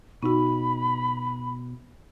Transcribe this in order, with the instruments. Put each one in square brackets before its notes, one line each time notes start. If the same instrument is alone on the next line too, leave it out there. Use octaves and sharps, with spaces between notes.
[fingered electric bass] B2 [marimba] D#4 F#4 [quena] B5